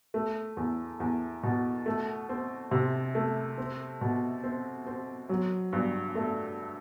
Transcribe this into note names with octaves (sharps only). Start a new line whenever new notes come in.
A3
E2
E2
B2
A3
C4
C3
A3
C4
B2
C4
C4
F#3
G2
A3